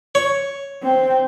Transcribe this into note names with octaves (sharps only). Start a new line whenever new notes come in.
C#5
C4 G5